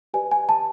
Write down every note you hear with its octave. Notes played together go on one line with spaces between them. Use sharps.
G4 B4 D5 G#5
G#5
A5